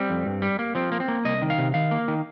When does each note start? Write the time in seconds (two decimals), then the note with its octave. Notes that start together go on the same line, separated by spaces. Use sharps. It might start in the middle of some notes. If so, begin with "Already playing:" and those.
Already playing: G3 C4
0.10 F2
0.26 G2
0.42 G3
0.59 A#3
0.75 F3 C4
0.92 A#3
1.00 C4
1.08 A#3
1.25 C2 D#5
1.42 D#3
1.50 F5
1.58 C3
1.74 D#3 F5
1.91 A#3
2.08 D#3